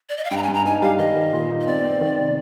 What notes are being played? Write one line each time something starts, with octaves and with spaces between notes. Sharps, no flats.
D5
D#5
F5
G2 G5
A#5
G#5
G2
A#5
D#4 G#5
G3 F5
D#3 D#5
D#3
A#2
D#4
D#5
C4 D5
C4
D#3
C3